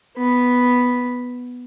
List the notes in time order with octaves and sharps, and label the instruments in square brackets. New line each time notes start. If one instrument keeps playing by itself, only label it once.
[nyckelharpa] B3 B5